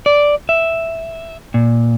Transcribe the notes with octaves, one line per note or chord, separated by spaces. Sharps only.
D5
E5
A#2